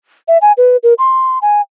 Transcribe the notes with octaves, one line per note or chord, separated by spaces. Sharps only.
E5
G#5
B4
A#4
C6
G#5